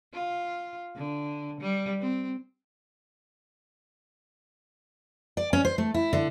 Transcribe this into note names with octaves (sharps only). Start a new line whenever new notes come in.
F4
D3
G3
C4
D5
C#4
C5
A3
E4
D3